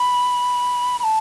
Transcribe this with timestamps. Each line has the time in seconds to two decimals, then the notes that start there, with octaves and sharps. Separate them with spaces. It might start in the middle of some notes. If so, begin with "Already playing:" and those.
Already playing: B5
0.99 B5
1.03 A5